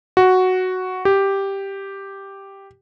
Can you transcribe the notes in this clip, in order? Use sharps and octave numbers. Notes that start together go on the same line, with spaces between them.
F#4
G4